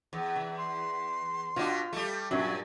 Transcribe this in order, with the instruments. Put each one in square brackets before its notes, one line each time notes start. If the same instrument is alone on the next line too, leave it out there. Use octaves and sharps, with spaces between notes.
[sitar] E2
[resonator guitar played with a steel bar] E3
[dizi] C6
[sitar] B2 D4 [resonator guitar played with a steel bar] F4
[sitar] G3 A3
[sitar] G2 A#2 [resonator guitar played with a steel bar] F#3 C#4 E5